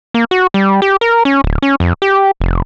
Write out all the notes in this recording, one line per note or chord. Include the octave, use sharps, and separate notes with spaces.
A#3
F#4
G3
G4
A#4
C#4
D1
C#4
F2
G4
F1